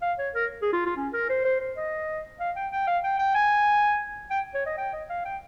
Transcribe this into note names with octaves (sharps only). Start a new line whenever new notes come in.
F5
C#5
A#4
G#4
F4
F4
C#4
A#4
C5
C5
C5
D#5
F5
G5
G5
F5
G5
G5
G#5
G5
C#5
D#5
G5
D#5
F5
G5